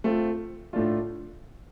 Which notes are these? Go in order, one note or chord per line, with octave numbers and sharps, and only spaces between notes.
A3 C4 F4
A2 A3 D4 F4